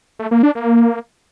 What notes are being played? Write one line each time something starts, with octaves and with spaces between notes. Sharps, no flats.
A3
A#3
D4
A#3